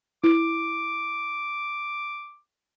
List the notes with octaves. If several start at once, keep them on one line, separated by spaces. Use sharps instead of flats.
E4 D6